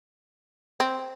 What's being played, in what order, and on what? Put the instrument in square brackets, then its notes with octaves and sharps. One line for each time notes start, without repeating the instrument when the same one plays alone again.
[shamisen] C4